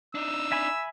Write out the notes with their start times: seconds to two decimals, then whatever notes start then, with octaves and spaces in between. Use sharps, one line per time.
0.15 D4 D#4 E6
0.52 E5 G#5 B5